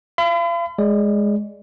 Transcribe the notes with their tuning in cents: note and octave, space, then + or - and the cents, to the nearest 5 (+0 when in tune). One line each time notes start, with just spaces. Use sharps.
F5 -40 B5 +45
G#3 +0 D5 -10